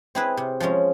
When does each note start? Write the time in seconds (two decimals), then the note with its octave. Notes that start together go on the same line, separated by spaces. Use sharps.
0.15 C4 E4 G#4 B4
0.37 C3
0.60 F3 G#3 C#4